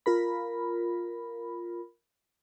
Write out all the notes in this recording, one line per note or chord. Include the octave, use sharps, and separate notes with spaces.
F4 A#4 B5